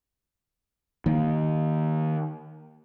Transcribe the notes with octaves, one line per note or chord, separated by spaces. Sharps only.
D#3 A#3